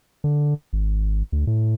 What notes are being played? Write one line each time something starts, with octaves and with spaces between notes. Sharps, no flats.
D3
G#1
D2
A2